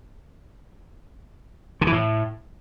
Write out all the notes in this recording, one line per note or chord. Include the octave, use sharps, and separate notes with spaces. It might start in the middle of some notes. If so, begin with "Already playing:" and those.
D3
E3
A2